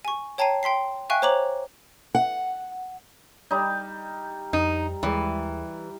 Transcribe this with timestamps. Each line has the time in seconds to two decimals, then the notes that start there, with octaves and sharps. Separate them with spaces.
0.05 G#5 C#6
0.38 C#5 G5 A5 A#5 C7 D#7
0.63 G5 C6 B6 C7
1.10 E5 F5 G5 G#5 C#6 F#6
1.22 C5 C#5 A#5 D6 F7 F#7
2.15 F#5
3.51 G3 D#4
4.53 F2 D#4
5.03 D#2 E3 G3 G#3